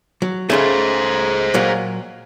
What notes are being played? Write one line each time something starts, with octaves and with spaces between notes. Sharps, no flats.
F#3
C#2 C#3 A3 G#4 C5
A#2 F#3 A#4